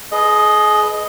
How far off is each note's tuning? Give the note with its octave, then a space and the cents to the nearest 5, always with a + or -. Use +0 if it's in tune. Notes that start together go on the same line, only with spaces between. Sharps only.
G#4 +35 B4 +0 D#5 +0